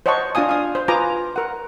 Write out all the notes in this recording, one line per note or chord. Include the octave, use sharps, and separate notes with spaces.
C5 C#5 D#5 F#5 A5 C#6
D4 F4 F5 G#5 D#6
F5 D#6
C5
F4 B4 G#5 A#5 D6 D#6
A#4 F#5